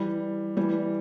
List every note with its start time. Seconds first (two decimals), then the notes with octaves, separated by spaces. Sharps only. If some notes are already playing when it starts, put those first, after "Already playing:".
Already playing: E3 G3
0.57 E3 G3